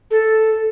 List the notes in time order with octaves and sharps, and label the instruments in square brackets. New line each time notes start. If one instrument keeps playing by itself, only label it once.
[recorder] A4